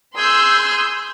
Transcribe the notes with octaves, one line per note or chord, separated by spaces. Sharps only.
G#4 C6 E6 G6